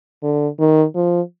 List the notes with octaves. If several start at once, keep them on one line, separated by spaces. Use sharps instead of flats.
D3
D#3
F3